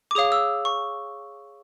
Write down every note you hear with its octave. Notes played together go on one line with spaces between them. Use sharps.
D6
G#4 C#5 F5 D#6
E6
C#6